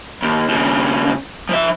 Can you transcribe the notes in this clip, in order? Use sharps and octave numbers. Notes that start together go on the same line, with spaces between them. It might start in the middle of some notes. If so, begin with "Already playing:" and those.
D#2
D#2 C#3
F3 E5